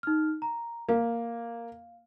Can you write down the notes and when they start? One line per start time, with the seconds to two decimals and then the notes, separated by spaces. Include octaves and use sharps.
0.03 D#4 F6
0.42 A#5
0.89 A#3 F5